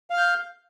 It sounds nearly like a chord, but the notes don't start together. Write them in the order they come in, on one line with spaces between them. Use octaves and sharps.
F5 F6 G6